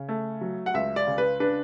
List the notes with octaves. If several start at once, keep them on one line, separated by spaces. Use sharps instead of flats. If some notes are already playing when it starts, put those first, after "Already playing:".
Already playing: C#3
A3
F#3
F#5
C#2 E5
D5
C#3
B4
D4 B4